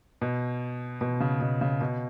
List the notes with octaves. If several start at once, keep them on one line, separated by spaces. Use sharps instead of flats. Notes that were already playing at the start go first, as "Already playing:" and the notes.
B2
B2
C#3
B2
C#3
B2